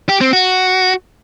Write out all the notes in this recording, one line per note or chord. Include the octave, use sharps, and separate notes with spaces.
G4
C4
F#4